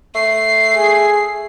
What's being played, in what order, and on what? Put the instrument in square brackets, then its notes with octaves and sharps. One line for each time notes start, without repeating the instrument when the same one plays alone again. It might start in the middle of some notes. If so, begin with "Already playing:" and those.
[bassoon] A3 [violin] C7
[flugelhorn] G#4